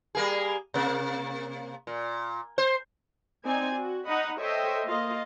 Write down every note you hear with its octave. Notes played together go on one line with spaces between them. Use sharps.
G3 A#3 G#4
C3 A#3
A#2
C5
C4 D#4 D5 G#5
F#4
D#4 D#5 F#5 B5
A4 C5 C#5 D#5 E5 G5
A#3 F4 D#5